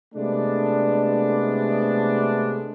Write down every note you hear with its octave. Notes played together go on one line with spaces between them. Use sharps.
C3 G#3 A3 B3 D4